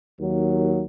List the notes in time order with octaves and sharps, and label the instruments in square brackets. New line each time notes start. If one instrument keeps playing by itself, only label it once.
[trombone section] D#2 F#3